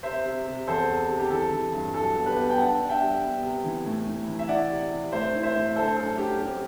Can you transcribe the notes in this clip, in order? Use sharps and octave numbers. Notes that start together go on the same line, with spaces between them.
C3 C5 E5
C3
C3
E2 A4 C5
C3
C3
G4
E3 A4
E3
G2
F#3 A4
B3
G4 B4
B3
G5
D4 F#5 A5
D4
E5 G5
G3
B3
C3
E3
A2
A2
E3
E5
E4 D5 F#5
C3
C3
A2 C5 E5
E4
C5 E5
A2
D3 A4 C5
F#2 A4
F#2 G4
C4 G4